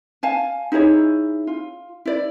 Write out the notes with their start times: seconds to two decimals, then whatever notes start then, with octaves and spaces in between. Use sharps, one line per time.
0.23 F5 G#5 A5
0.72 D#4 E4 G#4 C#5
1.47 F4
2.06 E4 D5